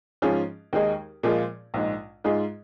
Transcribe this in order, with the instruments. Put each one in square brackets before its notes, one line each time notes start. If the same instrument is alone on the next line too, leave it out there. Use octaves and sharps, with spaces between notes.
[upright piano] G#2 F3 C#4 F4 G#4
D#2 D#3 G#3 D#4 G#4
A#2 F3 G#3 F4 G#4
A#1 G#2 G#3
G#2 G#3 F4 G#4